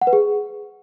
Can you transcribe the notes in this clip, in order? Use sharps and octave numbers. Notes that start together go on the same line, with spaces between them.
F#5
B4
G#4